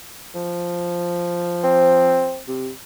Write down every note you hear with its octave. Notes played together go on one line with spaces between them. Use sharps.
F3
C4
C3